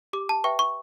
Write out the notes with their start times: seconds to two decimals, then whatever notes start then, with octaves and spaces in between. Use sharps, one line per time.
0.13 G4 D6
0.29 A5
0.44 B4 E5 G5 C#6
0.59 C#6